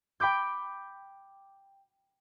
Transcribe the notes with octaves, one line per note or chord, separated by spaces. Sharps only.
G5 B5 D6 G6